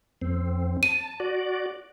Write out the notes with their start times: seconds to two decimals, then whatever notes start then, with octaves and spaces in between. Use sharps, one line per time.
0.21 F2 C4
0.83 A5 D#7
1.20 F#4 D5